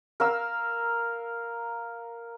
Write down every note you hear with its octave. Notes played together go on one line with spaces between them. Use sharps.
A#4 F5 E6